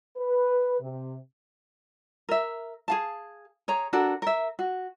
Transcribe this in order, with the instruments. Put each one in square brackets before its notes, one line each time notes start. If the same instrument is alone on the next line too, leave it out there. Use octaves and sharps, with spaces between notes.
[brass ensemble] B4
C3
[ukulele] A#4 E5
G#4 F5 A5
G#4 C#5 A#5
D4 F#4 A4 A#4
A#4 E5
F#4